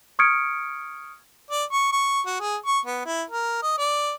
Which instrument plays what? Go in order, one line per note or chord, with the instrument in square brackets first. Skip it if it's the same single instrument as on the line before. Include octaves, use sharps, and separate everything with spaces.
[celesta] C#6 D#6 F6 G#6 C#7 D7
[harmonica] D5
C#6
C#6
F#4
G#4
C#6
B3
E4
A#4
D#5
D5